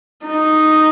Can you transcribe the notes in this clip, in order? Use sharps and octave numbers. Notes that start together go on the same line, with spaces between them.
D#4